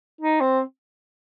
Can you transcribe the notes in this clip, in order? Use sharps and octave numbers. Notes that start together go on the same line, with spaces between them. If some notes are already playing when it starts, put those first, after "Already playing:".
D#4
C4